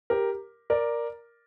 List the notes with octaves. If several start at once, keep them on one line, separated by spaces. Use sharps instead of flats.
G4 A#4
A#4 D5